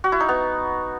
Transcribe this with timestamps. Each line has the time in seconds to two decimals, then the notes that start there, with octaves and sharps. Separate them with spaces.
0.04 F#4
0.12 E4
0.20 D#4
0.29 B3